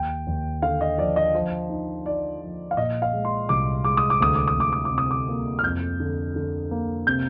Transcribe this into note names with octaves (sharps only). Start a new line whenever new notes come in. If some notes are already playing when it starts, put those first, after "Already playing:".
Already playing: D#2 G5
D#2
D3 F5
D#5
F3 D5
D#5
F3
D#4
D#4 D5
F3
F5
A#2 D#5
F5
G#3
C6
C2 D6
G#3 D6
D#6
D6
D2 D#6
D6
D#6
D2 D6
D#6
D6
C3
D#6
D6
A#3
F6
F2 G6
D3
D3
A#3
C3 G6